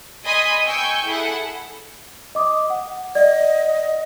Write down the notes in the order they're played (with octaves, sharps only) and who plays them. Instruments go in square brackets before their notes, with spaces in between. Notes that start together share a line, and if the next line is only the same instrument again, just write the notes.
[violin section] D#5 G#5 B5 C6 D#6
G5 G#5 C#6 E6 G6
E4 G#4 A4 F#5
[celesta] D#5 D6 D#6
F#5
[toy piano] D5 [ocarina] D#5